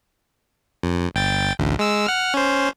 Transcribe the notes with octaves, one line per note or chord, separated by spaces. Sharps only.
F2
G1 G5 A6
A1 D2
G#3 E6
F#5 F6
C#4 C5